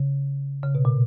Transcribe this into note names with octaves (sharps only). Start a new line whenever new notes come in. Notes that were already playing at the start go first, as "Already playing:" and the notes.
Already playing: C#3
C#3
B2
A#2